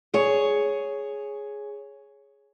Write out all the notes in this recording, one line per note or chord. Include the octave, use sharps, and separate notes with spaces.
G#4 C#5